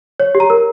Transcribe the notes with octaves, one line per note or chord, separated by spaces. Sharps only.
C#5
G4
A#5
A#4